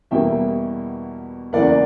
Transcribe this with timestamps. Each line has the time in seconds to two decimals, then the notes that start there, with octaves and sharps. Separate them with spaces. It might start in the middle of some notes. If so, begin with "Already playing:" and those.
0.11 E2 B2 G3 A#3 E5 G5
1.53 E2 C#3 E3 A#3 D5 F#5